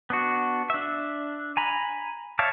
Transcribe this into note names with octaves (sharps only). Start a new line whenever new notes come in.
B3 D4 F#4
D4 E5
G#5 A#5 B5
C#5 D5 E5 F5 A5